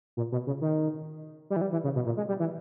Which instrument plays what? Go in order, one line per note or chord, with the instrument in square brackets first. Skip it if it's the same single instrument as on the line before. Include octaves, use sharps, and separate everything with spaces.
[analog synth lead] A#2
B2
C#3
D#3
G3
E3
G3
E3
C#3
B2
A#2
G#3
G3
E3